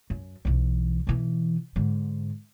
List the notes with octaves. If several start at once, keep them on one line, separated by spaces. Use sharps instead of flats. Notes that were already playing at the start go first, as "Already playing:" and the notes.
F#2
B1 E3
B2 E3
G#2 D3